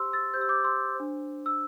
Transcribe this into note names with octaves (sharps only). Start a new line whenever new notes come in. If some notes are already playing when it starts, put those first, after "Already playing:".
Already playing: G4 C5 C6 E6
E6 A6
G4 C5 E6 G6
D6 G6
C6 E6
C5
D4
E6